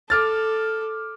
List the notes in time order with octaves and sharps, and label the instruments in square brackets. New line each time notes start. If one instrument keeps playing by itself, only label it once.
[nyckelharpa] A4 [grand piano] D6 F6 A6